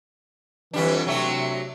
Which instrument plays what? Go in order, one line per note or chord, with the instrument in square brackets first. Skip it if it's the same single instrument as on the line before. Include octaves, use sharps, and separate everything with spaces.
[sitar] F2 G3 D4 [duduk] E3
[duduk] C3 [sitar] F#3 A3 D4